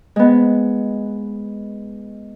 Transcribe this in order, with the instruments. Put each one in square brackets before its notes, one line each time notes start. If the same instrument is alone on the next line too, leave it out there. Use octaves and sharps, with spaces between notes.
[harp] G#3 B3